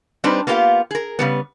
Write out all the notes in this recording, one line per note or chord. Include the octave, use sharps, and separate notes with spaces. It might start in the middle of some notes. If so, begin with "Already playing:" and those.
G3 C4 D4 D#4 B4 C5
A#3 B3 F4 G4 F5
G#4 A#4
C#3 G3 B3